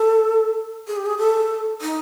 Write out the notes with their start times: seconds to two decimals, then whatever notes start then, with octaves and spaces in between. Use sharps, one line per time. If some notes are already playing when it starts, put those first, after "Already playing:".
Already playing: A4
0.87 G#4
0.97 G4
1.06 G#4
1.19 A4
1.82 D#4